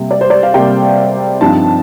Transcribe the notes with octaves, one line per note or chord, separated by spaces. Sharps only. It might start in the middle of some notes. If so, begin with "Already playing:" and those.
Already playing: C3 G3 A#3
D5
C5
D5
F5
C3 G3 A#3 G5
G2 F3 C4 D#4 A5